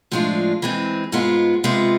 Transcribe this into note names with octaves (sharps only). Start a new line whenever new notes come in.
A2 F3 G#3 D4 F4
E3 G#3 C4
G#2 G#3 B3 F4
C3 G#3 B3 F4